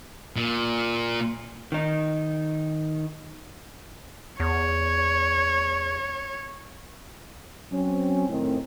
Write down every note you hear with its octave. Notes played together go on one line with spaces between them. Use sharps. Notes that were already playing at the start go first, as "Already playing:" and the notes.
A#2
D#3 D#4
E2 C#5
F#3 C4 C#4
A2 D#3 C4